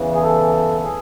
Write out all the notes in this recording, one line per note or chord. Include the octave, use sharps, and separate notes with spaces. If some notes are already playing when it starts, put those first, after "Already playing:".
Already playing: E2 C#3 E3
G#4
A4
G#4